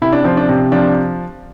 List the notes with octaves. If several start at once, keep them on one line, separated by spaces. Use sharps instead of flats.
C3 E4
D4
F3 C4
D4
C3
F3 D4